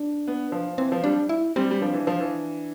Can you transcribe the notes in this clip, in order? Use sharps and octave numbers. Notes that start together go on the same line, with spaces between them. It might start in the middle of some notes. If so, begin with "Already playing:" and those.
Already playing: D4
B3
F3
E3 C4
F3
G3 D4
E4
G3 C4
G3
F3 D4
E3
F3
E3